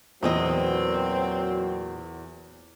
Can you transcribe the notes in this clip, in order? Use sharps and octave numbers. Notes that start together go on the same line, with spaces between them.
E2 A#2 F#3 B3 C4 F#4 D#5